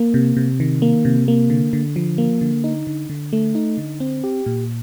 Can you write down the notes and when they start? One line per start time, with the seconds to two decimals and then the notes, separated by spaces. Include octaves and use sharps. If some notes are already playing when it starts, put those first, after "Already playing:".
Already playing: A#3
0.14 C3
0.37 C3
0.60 D#3
0.82 A#3
1.05 C3
1.28 A#3
1.50 D3
1.73 D3
1.96 F3
2.18 A#3
2.41 D3
2.64 D#4
2.87 D3
3.10 D3
3.33 A3
3.55 D#4
3.78 D3
4.00 C4
4.24 G4
4.46 A#2